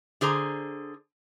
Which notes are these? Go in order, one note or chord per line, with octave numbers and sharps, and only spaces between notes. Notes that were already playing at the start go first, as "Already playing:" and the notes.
D3 G#4 C5 A#5